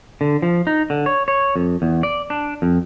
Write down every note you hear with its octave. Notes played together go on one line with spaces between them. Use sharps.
D3
F3
D#4
D3
C#5
C#5
F2
E2
D5
D4
F2